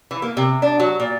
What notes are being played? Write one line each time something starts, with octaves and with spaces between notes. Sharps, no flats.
E3
A#3
C3
D4
F#3
A#2